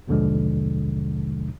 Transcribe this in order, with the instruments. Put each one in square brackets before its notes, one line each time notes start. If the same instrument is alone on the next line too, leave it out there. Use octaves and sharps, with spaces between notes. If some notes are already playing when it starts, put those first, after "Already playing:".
[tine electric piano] A#1 D#2 B2 D3 F3 G#3